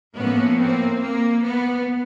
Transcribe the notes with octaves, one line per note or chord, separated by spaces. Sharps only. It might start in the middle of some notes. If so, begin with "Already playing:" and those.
A2 F3 A#3 B3 C#4
A#3 C4
A#3
B3